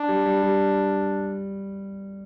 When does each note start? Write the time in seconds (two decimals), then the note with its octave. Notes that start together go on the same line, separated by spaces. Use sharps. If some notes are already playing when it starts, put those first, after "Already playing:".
Already playing: D4
0.08 G3
0.26 G3
0.42 G3